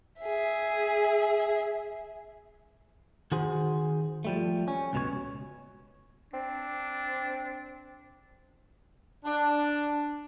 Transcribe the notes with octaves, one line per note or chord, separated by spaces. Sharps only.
G#4 E5
D#3 F#4 G#4 C5
F3 G3 A3
C#4
C#2 B2 C#5
C4 D4
D4